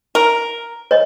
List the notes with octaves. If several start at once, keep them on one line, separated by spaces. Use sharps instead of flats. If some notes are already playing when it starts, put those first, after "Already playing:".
A#4
C#5 D#5